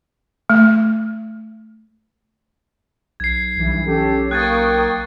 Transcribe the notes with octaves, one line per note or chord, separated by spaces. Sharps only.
A3
B1 G#6 C7
B1 G2 E3
C#4 G4 A4
A#3 G5 C#6 D#6 F#6 G#6 A6